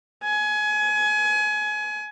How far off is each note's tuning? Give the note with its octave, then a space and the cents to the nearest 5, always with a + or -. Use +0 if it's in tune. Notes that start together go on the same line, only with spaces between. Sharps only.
G#5 +25